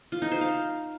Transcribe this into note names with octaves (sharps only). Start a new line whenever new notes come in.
F4
D#4
C5
F5